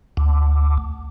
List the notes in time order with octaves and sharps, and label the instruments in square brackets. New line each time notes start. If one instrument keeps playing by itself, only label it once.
[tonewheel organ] D2